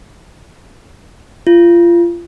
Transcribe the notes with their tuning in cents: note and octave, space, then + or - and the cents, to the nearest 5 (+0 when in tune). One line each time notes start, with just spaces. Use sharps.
F4 -25